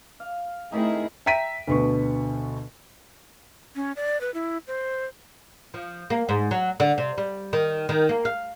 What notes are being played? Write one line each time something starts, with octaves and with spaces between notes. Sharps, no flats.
F5
D#3 A3 C4 D#4 E4 G#4
E5 G5 A#5 B6 D7 D#7
D2 B2 D3 B3 C#6
C#4
D5
B4
E4
C5
F3
A#3
G#2
F#3
D3
C3
G3
D#3
D#3
A#3
F5